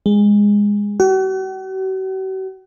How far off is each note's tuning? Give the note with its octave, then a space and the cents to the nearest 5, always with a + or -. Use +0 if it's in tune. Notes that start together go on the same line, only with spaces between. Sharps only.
G#3 -15
F#4 +45